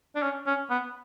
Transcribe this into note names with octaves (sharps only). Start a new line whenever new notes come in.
D4
C#4
C#4
B3